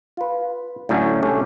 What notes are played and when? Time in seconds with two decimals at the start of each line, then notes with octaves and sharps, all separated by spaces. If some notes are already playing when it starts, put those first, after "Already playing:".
0.17 F4 B4
0.89 A2 D3 F#3 C#4
1.22 C2 A3 C#4 G4